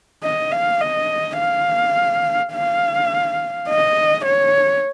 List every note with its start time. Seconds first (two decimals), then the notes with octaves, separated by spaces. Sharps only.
0.23 D#5
0.51 F5
0.81 D#5
1.38 F5
2.53 F5
3.69 D#5
4.26 C#5